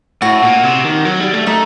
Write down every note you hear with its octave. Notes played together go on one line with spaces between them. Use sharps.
A2 F#4
A#2
C3
D#3
F#3
G3
A3
A3 D#4